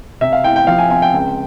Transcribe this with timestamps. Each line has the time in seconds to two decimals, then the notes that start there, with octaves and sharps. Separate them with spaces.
0.21 C3 E5
0.33 F5
0.43 E4 G5
0.56 G5
0.67 F3 F5
0.78 G#5
0.90 C4 G#5
1.02 G5
1.14 C#2